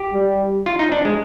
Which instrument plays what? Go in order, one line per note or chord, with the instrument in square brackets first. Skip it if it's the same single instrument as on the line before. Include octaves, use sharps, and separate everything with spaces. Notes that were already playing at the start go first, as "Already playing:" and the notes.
Already playing: [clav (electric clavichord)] G4
[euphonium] G3
[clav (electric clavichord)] F4
D#4
D4
G#3